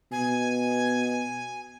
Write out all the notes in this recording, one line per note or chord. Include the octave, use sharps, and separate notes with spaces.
B2 G#5